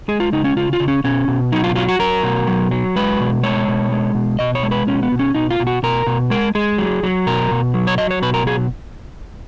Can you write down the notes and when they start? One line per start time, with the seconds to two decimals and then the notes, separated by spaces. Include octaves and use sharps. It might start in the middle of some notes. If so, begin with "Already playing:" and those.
0.08 G#3 G#4
0.20 F4
0.32 C#3 D#4
0.44 C#4
0.56 C#3 F4
0.73 F4
0.80 C#3
0.88 C#4
1.04 B2 C#4
1.28 B2
1.52 F#3 D#4
1.64 F4
1.75 F#3 F4
1.89 F#4
1.99 F#3 A#4
2.23 B2
2.47 F#3
2.71 F#3
2.96 G#3 B4
3.20 B2
3.43 G#3 C#5
3.68 B2
3.92 G#3
4.15 B2
4.39 B2 D#5
4.55 C#5
4.63 G#3
4.71 B4
4.87 B2 C#4
5.03 B3
5.12 B2
5.19 C#4
5.35 B2 D#4
5.50 F4
5.60 B2
5.67 F#4
5.83 B2 A#4
6.07 B2
6.30 G#3 A#4
6.55 G#3 G#4
6.78 F#3
7.03 F#3
7.27 B2 A#4
7.51 B2
7.74 F#3
7.87 C#5
7.98 F#3 D#5
8.11 C#5
8.22 B2 B4
8.34 A#4
8.46 F#3 G#4